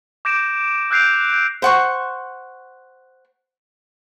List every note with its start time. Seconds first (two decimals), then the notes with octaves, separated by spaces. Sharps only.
0.25 D6 G6 A#6 D7 E7
0.91 E6 F#6 G6 C7 D7 F7
1.33 G6
1.62 C5 F#5 C#6